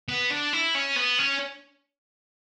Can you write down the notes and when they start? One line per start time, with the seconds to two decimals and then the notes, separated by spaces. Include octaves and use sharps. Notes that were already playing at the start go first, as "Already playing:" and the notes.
0.08 B3
0.30 D4
0.53 E4
0.75 C#4
0.96 B3
1.19 C#4